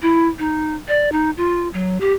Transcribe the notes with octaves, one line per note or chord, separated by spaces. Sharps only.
E4
D#4
D5
D#4
F4
F#3
G4